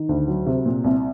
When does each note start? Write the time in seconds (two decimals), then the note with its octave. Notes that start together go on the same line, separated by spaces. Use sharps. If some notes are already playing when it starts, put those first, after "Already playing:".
Already playing: D#3
0.09 D2
0.28 F#3
0.46 C3
0.66 A#2
0.84 C2